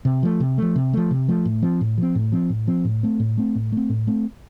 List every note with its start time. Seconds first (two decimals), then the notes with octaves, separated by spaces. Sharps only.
0.05 C3
0.23 F3 A3
0.40 C3
0.58 F3 A3
0.76 C3
0.93 F3 A3
1.11 C3
1.28 F3 A3
1.45 A2
1.62 F3 C4
1.81 A2
1.98 F3 C4
2.15 A2
2.32 F3 C4
2.50 A2
2.67 F3 C4
2.85 A2
3.03 A3 C4
3.20 A2
3.38 A3 C4
3.55 A2
3.72 A3 C4
3.90 A2
4.07 A3 C4